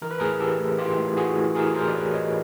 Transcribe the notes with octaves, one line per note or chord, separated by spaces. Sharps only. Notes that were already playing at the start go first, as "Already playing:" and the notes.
E3 A#4
B4
A2 G#4 A#4
E3 G4 A4
A2
E3 F4 G4
A2
E3 F#4 G#4
A2
E3 G#4 A#4
A2 A#4 C5
D5
E3 B4 C#5
A2 C#5 D#5